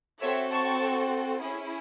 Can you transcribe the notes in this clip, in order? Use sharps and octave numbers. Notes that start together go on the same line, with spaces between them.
C4 F#4 A4 C#5 E5
A5 C#6
C#4 E4 G#4